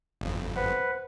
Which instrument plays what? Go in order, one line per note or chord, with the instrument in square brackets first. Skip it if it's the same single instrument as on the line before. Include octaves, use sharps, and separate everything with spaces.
[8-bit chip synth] G1 F2
[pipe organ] B4 [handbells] C5 F#5